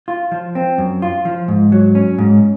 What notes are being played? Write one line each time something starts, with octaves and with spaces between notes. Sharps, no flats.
F4
F3
C4
F#2
F4
F3
G#2
F#3
C#4
G#2